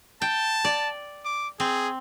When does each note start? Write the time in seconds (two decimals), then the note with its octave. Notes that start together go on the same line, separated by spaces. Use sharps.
0.22 G5 A5
0.65 D5
1.25 D6
1.60 C4 G#4